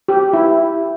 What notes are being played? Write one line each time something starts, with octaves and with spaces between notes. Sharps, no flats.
G4
E4